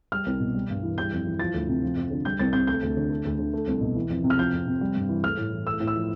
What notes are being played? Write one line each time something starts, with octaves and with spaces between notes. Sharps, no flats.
G3 F6
C2
B2
G3
G2
E3
G3 G6
F2
E3
F3 A6
D2
C3
F3
F2
D3
G3 G6
C2 A6
C3 G6
A3 G6
D2
D3
A3
D2
D3
A3
C2
B2
E3
F2
C3
F6
F3 G6
F2
C3
G3
G2
E3
A3 F6
A2
E3
A3 E6
A2
E6
F3